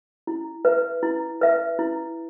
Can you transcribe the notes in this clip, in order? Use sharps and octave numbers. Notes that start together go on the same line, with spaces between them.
E4
B4 E5
E4
B4 E5
E4